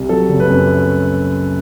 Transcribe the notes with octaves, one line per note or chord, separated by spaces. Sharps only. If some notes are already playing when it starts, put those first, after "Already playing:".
Already playing: C2
F#3 A4
F#1
B4
F#2